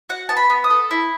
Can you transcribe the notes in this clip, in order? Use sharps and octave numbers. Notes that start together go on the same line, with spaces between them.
F#4 F#5
B3 A5
B5
B3
D#6
A4
E4